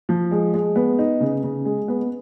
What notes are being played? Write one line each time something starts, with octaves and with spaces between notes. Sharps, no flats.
F3
G#3
G#3
B3
D#4
C#3
C#3
G#3
B3